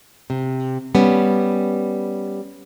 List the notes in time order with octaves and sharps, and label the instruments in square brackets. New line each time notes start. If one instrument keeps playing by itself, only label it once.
[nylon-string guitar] C3
G3 B3 C#4